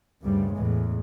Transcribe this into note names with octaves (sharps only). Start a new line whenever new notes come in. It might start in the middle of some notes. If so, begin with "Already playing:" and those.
D2 G2 C#3 G3
E2 A2 G#3